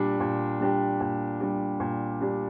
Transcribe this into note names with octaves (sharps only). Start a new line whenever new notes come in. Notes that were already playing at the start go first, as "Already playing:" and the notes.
Already playing: A#2 G3 D4 G4
A#2
G3 D4 G4
A#2
G3 D4 G4
A#2
G3 D4 G4